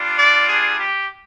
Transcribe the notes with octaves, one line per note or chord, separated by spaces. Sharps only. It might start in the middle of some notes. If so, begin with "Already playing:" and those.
Already playing: G3 D4 F4
D5
G#4
G4